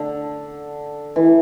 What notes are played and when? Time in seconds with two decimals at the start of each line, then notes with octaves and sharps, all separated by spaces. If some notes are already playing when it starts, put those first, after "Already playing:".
Already playing: D3
1.16 E3